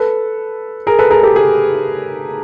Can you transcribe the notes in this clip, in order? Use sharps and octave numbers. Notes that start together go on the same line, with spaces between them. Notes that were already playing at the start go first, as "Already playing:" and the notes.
Already playing: A4 B4
G#4 A#4
A4 B4
G#4 A#4
G4 A4
G#4